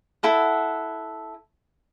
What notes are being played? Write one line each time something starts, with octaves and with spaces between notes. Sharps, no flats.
E4 A4 F#5